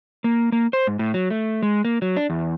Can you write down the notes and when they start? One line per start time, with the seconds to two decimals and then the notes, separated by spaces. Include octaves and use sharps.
0.24 A#3
0.52 A#3
0.73 C5
0.87 G#2
0.99 A2
1.14 F#3
1.30 A3
1.63 G#3
1.85 A#3
2.02 F#3
2.17 D4
2.30 E2